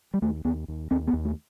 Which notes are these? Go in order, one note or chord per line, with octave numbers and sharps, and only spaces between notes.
G3
D#2 A3
D#2 B3
D#2
D#2 C4
B3
D#2
A3